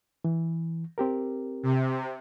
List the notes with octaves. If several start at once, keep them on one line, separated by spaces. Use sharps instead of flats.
E3
C4 G4 A#4
C3